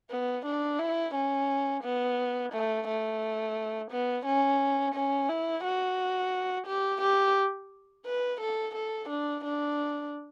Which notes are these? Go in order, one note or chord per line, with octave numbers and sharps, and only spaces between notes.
B3
D4
E4
C#4
B3
A3
A3
B3
C#4
C#4
E4
F#4
G4
G4
B4
A4
A4
D4
D4